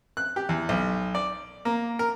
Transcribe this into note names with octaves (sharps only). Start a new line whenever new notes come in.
F#6
G4
E2
B1
D5
A#3
A#4